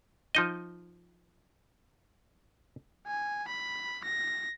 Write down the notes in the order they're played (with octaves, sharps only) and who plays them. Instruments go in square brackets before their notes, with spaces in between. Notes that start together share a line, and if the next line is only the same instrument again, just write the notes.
[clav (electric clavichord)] F3 D#4 D#5
[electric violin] G#5
B5
A#6